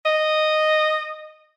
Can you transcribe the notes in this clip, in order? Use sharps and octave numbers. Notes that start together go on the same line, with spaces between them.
D#5